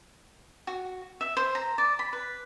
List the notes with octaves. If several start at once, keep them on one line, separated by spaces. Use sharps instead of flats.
F#4
E5
C5
A#5
D5
B5
B4